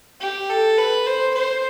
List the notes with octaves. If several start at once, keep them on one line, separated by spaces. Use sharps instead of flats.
G4
A4
B4
C5
C5